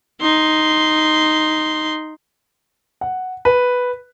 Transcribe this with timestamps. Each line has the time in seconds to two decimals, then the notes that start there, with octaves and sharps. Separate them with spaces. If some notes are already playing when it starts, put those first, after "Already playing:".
0.21 D#4 C6
3.01 F#5
3.45 B4